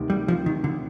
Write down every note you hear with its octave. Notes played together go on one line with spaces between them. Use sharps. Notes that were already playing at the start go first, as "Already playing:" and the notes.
Already playing: D2 C3 D#3
G3
F3
D#3
D3